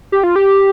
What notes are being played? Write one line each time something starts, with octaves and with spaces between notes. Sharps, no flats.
G4
F4
G4